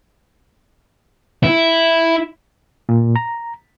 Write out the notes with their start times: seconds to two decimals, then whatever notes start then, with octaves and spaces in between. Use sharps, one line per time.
1.43 E4
2.89 A#2
3.16 A#5